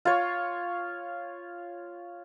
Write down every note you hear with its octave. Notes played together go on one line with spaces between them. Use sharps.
F4 C#5